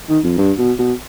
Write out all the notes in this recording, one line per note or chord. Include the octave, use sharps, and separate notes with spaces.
D#3
F2
G2
B2
B2